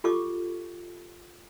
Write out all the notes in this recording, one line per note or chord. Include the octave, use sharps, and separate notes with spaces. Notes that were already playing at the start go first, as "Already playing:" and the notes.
F4 G4 A4 C#6 D6